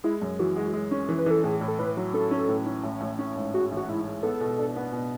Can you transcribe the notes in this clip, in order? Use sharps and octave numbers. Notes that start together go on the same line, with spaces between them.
G#3 E4
F#2
E3 F#4
G#3
G#3
C#4
E3
B4
E3 A4
A2 G#4
A2
A4
A2 B4
F#3
C#4 A4
C#4
A2
C#4
A1
A1
C#4
G#2
G#3 F#4
A1
F#4
G#2 E4
G#3
B3 A4
B2
D4
B3
B2